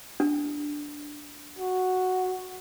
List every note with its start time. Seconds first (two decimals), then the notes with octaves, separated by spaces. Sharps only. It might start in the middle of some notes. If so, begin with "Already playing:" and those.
0.20 D4
1.59 F#4